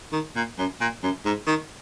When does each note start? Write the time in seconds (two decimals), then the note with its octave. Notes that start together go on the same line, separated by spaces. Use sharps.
0.13 D#3
0.36 A#2
0.58 F#2
0.80 A#2
1.03 F#2
1.25 G#2
1.47 D#3